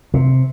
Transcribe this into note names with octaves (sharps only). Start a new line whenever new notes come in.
C3